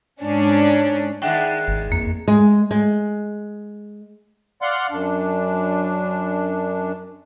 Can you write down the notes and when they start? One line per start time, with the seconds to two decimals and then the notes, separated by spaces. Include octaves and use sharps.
0.22 G#2 C#4 D4
1.22 D#3 G#3 D4 E5 F#5 G5
1.68 G#1
1.92 F2 A#3
2.28 G#3
2.71 G#3
4.62 D5 F5 F#5 C6
4.91 F#2 D4